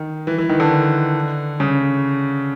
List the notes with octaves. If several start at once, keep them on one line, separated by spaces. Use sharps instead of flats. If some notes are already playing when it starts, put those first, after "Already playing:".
Already playing: D#3
E3
E3
D#3
D3
C#3